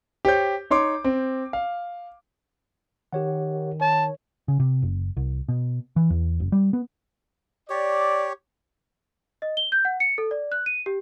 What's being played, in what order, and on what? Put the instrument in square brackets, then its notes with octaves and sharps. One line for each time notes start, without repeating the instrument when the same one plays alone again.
[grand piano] G4 C5 C#5 G6
D#4 C#5 C6 D6
C4
F5
[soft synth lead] D#3 [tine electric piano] G4 C#5 F#5
[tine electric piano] C#5 [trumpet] A5
[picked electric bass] C#3
C3
F#1
C2
B2
E3
E2
F#1
G3
B3
[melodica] G4 C#5 [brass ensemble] D5
[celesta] D#5
G7
G6
F#5
C#7
A4
D5
F#6
D#7
G4